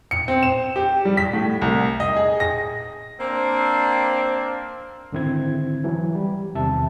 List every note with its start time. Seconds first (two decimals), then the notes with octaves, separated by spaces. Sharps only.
0.11 C#7
0.28 C4
0.43 E7
0.76 G4
1.05 G3
1.17 B6
1.33 A2
1.62 C2
2.00 D#5
2.16 G#4
2.40 A#6
3.20 A#3 C4 D4
5.12 G#2 D3 D#3 C4 E4 G#6
5.84 E3 F#3
6.15 G3
6.55 E2 C3 D#3 E5 A5